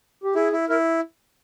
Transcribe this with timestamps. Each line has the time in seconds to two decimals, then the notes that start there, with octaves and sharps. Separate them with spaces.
0.24 G4
0.35 E4 G#4
0.52 E4
0.69 E4 A#4